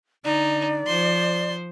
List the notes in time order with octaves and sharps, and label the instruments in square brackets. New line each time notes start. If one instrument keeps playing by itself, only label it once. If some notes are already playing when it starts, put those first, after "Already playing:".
[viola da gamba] D3 [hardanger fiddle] D#4 [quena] D5
[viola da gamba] F3 C5 [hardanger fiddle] C6